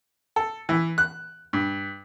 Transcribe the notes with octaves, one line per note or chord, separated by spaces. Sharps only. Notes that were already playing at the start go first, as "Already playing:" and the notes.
A4
E3
F#6
G2